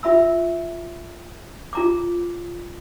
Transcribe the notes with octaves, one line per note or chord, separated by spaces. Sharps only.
F4 E5 B5 E6
F4 A#5 D6